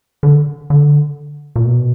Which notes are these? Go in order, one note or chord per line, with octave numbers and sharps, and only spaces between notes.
D3
D3
A#2
B2